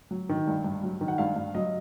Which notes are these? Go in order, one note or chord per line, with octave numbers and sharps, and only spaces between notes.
F#3
D#3
G2
G2
F#3
D#3
F#5
G2 F5
G2
F#3 D#5